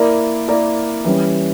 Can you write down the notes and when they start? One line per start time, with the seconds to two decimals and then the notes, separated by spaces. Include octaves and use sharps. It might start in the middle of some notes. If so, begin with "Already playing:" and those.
Already playing: A#3 E4 A#4 D5
0.48 A#3 E4 A#4 D5
1.05 E3 G3 C#4